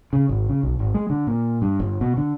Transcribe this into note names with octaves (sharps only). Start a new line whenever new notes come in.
C#3
G#1
C#3
B1
G#1
G#3
D3
A#2
G2
G1
B2
D3